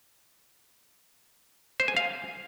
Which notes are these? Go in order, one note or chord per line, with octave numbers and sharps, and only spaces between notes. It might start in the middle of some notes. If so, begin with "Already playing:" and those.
C5
G#5
F5